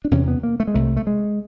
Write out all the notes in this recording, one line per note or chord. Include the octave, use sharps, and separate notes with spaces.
D4
E2 C3 C#4
B3
A#3
A3
G#3
C2 C3 A3
A3
G#3